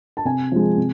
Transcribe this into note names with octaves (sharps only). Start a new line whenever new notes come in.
A5
C3 G#5
F3 G#3
C3